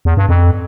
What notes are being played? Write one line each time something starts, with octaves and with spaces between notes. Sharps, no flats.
E2
G2
F2